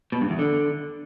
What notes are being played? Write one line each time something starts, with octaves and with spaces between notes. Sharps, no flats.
B2
G2
E2
D3